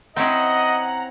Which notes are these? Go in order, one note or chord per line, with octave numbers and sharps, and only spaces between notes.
C4 C#4 E4 D#5 F#5 A#5